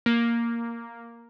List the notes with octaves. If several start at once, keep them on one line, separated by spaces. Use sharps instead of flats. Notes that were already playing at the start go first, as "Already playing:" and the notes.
A#3